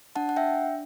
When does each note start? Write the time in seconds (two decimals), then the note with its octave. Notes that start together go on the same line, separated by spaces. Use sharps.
0.15 D4 F#5 A5
0.29 F#5
0.36 E5 G5